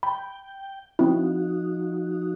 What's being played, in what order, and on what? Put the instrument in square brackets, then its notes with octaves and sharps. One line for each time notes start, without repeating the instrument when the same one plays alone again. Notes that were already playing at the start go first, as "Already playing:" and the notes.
[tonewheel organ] G5 [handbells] B5
[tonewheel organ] F3 D#4 F#4 [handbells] C4 E4